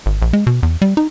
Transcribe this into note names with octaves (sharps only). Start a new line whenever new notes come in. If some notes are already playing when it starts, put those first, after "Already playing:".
G#1
A#1
G#3
B2
E2
G3
D#4